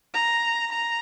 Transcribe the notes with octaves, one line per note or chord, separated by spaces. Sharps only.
A#5
A#5